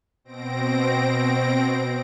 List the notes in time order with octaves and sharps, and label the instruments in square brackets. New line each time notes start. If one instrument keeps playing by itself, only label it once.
[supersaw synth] B2 C4 A#6 D7